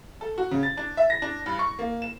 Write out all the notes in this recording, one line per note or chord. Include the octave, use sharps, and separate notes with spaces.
A4
F#4
C#3
A6
D4
E5
A#6
D4
G2
C#6
A#3
E7